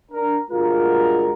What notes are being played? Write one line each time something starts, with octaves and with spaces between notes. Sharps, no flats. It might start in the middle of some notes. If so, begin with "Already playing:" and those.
D4 A#4
G1 G#3 F4 F#4 A#4